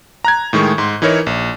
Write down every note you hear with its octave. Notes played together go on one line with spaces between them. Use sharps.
A#5 F#6 G#6
A2 D#3 G#3 C#6
G#2 C6
E3 D#4 E4 A#4 C#5
A#1